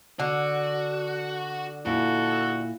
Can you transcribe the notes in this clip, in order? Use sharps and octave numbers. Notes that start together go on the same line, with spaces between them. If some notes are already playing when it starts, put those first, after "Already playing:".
D3 F#4
A#2 E4 F#4 A4